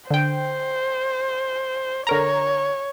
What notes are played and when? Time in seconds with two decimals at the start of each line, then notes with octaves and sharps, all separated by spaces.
0.11 D3 C5 G5
2.07 D3 A#4 C#5 A#5